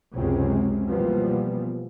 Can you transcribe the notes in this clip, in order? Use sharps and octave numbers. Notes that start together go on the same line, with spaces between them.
C#2 F#2 C3 G#3 C4 C#4
B2 E3 F3 G3 A#3 B3